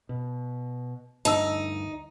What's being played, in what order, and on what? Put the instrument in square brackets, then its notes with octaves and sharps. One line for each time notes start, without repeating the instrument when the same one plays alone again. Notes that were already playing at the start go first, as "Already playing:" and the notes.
[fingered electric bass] B2
[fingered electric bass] D2 G2 D3 [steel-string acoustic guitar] D#4 [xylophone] A5 E6